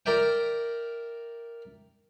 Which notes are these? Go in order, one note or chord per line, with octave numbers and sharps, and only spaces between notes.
A#4 D5 E5 G5